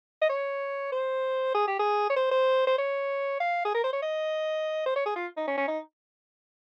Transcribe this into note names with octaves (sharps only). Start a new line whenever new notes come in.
D#5
C#5
C5
G#4
G4
G#4
C#5
C5
C5
C5
C#5
F5
G#4
A#4
C5
C#5
D#5
C5
C#5
G#4
F4
D#4
C#4
C#4
D#4